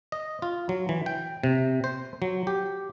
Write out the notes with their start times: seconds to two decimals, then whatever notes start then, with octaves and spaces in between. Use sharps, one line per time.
0.12 D#5
0.42 F4
0.69 F#3
0.89 E3
1.06 G5
1.43 C3
1.84 C5
2.22 F#3
2.47 G4